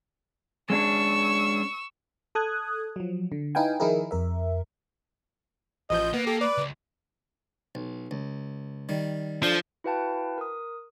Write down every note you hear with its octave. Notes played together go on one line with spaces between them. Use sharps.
G#3 C#4 D4 C#6 E6
A4 D#6 F#6 G#6
F3 F#3
D3
D#4 E4 B4 F5 G5 G#5
D#3 F3 D#4 E4 G#4 A#4
F2 A#4 E5
A1 F3 D#5 G6
A#3 B3
G4 A4
B4 D5
C#2
B1
C#2
D#3 G3
F3 D4 A4
E4 F#4 B4 F5 G5 A5
A#4 D#6